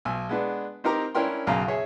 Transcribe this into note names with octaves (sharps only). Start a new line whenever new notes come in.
B1 G#5 E6
G#3 B3 D4
C4 D#4 G4 A#4 A#5
C#4 D4 E4 A#4 G5 C6
B1 F#2 C#3 F5 A#5
G#4 C#5 E5 G#5